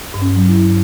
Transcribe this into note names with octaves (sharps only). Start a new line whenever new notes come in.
G2
C#4
F#3
E4
G2